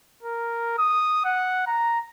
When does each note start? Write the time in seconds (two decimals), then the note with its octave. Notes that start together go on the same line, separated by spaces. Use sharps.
0.23 A#4
0.78 D#6
1.25 F#5
1.66 A#5